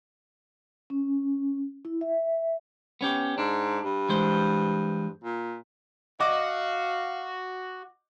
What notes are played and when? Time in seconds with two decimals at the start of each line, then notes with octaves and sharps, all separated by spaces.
0.90 C#4
1.85 E4
2.01 E5
3.01 B3 C#4 G4
3.38 G#2 D4
3.84 G2
4.09 E3 G#3 C5
5.24 A#2
6.20 F#4 D#5 F5 D6